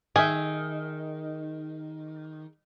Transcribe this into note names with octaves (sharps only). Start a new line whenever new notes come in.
D#3 G#4 E5